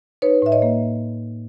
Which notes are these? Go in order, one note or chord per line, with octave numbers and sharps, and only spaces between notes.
D#4 B4 C#5
A2 E5
C#5 D#5
A#3